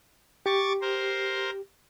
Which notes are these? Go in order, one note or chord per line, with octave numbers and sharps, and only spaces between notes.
G4 C#6 D6 A6
A#4 C5